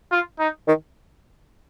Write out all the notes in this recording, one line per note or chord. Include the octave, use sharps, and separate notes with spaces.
F4
D#4
D#3